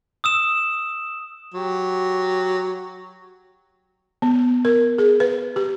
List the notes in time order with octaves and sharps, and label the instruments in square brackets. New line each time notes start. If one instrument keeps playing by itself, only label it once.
[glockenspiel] D#6 E6 E7
[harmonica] F#3 F#4 G4
[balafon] B3
A#4
G#4
B4
G4